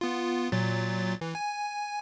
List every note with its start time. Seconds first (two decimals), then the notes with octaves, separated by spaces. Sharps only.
0.01 B3 F4
0.52 A#2 F#3 A6
1.21 E3
1.35 G#5